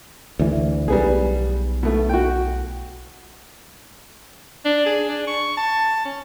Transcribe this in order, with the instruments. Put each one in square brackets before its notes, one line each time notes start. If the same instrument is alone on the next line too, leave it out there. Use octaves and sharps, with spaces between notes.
[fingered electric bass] D2 E3
[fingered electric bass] B1 [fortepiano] G3 B3 G#4
[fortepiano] B2 A3
F#4 G5
[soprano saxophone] D4
G#4
D4
C#6
A5
C#4